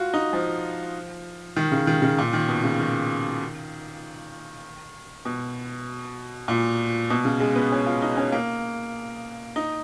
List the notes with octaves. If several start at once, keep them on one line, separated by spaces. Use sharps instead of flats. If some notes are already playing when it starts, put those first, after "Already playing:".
Already playing: F4 F#4
D#4
F3
D#3
C#3
D#3
C#3
A#2
D#3
B2
C#3
D#3
B2
A#2
B2
C#3
G#3
B3
C#4
F4
D#4
C#4
A#3
D#4